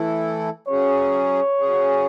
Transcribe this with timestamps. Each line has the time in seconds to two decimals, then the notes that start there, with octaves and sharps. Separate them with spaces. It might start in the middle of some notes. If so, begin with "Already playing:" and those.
Already playing: E3 A3 E4 A4
0.67 F#3 C#4 G#4 C#5
1.59 F#3 C#4 G#4